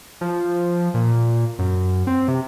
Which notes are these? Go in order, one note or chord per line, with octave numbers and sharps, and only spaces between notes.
F3
A#2
F#2
C4
C3